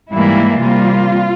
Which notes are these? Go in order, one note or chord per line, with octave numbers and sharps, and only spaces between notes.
G#2 E3 G3 A#3 E4
C3 G3 A#3 F4